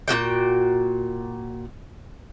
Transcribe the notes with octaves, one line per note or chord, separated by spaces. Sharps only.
A#2 C#4 F#4 G5